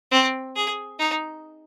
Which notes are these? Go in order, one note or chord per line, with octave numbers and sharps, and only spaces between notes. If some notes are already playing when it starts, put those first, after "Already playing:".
C4
G#4
D#4